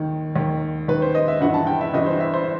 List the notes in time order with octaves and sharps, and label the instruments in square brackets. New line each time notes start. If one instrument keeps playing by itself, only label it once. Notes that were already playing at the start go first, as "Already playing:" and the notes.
Already playing: [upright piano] D#2 D#3
D#2 D#3
D#2 D#3 B4
C5
D#5
E5
G1 G2 E3 F#5
A5
G5
E5
G1 G2 E3 D#5
C5
E5
C5